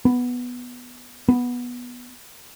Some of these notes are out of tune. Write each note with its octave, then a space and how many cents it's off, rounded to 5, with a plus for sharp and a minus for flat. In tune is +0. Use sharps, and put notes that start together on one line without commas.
B3 +0
B3 -10